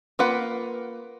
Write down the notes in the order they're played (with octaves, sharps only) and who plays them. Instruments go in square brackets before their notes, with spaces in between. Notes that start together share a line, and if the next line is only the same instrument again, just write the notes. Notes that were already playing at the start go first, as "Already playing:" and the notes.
[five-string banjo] A#3 F4 B4 F#5